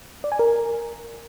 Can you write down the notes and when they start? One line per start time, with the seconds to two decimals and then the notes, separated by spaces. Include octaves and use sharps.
0.24 D5
0.32 G#5
0.39 A#4